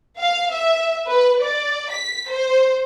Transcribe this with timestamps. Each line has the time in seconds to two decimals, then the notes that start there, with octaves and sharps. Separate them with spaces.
0.19 F5
0.52 E5
1.09 B4
1.43 D5
1.91 B6
2.30 C5